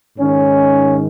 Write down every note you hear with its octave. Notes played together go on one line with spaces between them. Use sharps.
G#2 D#3 C#4